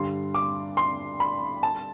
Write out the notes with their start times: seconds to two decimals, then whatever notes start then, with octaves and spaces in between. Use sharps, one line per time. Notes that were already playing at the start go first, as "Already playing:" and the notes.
Already playing: G2 D3 G3 C6
0.34 D6
0.77 C6
1.20 B5
1.63 A5